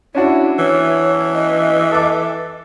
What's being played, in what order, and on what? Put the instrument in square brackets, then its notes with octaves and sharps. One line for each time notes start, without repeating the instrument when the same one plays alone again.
[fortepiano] C#4 D4 F#4 [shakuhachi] E4
[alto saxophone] E3 [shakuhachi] C#5
[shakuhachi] D#5
[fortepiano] A4 D6